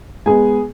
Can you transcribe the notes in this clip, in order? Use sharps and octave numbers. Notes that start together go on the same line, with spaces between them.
G#3 B3 G#4 G#5